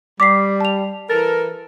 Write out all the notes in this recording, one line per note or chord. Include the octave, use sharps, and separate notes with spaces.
G3 D6 B6 C7
A5 F7
E3 A4 A#4 A6